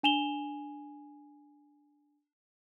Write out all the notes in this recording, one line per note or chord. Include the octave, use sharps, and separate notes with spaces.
D4 G#5 E7 F7 G7